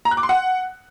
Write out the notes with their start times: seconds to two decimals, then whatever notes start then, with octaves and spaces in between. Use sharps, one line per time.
0.05 A#5
0.11 F#6
0.17 D6
0.23 C6
0.29 F#5